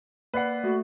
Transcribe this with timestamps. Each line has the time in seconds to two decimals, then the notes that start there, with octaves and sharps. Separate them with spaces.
0.34 A#3 B4 D5 F#5 C7
0.64 A3 F#4